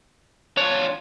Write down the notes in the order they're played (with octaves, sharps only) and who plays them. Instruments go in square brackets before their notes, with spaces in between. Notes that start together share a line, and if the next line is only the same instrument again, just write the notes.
[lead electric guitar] D4 F4 [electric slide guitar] C#5